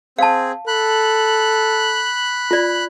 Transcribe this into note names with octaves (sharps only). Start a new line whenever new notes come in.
C4 G#4 F5 A5
A4 B5 F#6
F4 D5